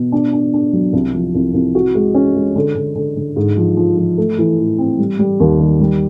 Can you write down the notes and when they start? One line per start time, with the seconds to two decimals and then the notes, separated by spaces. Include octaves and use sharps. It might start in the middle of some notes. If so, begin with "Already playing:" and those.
Already playing: B2
0.12 D4
0.33 D4
0.54 D4
0.73 F#3
0.93 C2
1.14 F3
1.35 C2
1.54 C2
1.75 F#4
1.95 G#3
2.15 C#4
2.35 G#3
2.56 D3
2.75 D3
2.96 D3
3.17 D3
3.36 G#2
3.57 F3
3.77 F3
3.97 F3
4.18 A3
4.38 E3
4.59 A2
4.78 C4
4.98 G3
5.19 G3
5.40 D#2
5.60 D#3
5.80 G3